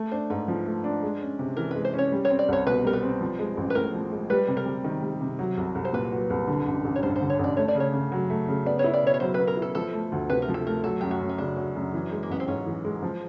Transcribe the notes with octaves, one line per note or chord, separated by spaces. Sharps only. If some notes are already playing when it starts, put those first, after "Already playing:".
Already playing: A3
D4 C5
G#2 B4
F3
A3
D4
G#3
C#4
C3
E3 A#4
G#3 B4
C5
C#4 C#5
G3
C#5
C4
D5
C2 C#5
B2 B4
G3 A#4
B4
C4
F3
G#3
A1
B4
A2 A#4
F3
G#3
G3 B4
C3
A#4
C3
D#3
G3
C3
F#3
C2
C2
C5
A#2 B4
F#3
C2
D3
A1
A1
C#5
G2 C5
C5
D3
C#5
A1
D5
A3 C#5
D5
C#3
C#5
C#3
F#3
A3
C#3
B3 D5
E4 C#5
D5
B2 C#5
C#5
F#3 C5
B3 B4
A#4
E4
A4
F3 A4
A3
D2
C3 B4
A#4
F3
A4
A3 A#4
F#3 A4
F#2 G4
F#4
F#2
C#4
C#3 D4
F#3
F#2
E3
G#3
A#3
A1 B3
C4
G#2 C#4
E3
G#3
F3